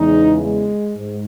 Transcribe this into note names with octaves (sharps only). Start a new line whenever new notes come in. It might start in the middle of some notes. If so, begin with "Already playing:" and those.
Already playing: E2 C#3 G#3 D#4
G#3
G#2